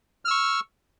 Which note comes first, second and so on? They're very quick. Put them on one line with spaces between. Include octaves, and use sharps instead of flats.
F6 E6 C#6